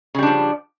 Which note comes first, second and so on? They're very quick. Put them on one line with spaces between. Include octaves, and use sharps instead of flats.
C#3 G3 D4 F3